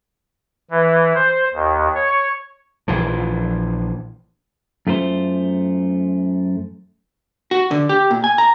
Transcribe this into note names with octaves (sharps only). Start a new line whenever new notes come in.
E3
C5
D#2
C#5
A#1 E3 F3
F#2 A3 F4 A4 C5
F#4
D3
G4
A#2
G#5
A#5